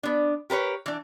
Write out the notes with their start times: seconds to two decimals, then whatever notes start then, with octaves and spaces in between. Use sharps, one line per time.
0.03 B3 D4
0.50 G4 A#4 B4 C#5
0.86 E3 D4